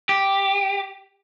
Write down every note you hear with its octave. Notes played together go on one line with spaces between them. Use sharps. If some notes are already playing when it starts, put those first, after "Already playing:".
G4